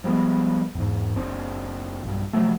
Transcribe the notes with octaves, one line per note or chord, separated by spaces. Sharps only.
F3 G3 G#3 B3
E2 G#2
F#1 C4 D4
B1 G2
C3 F3 F#3 A3